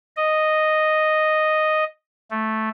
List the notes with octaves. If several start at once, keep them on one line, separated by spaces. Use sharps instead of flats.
D#5
A3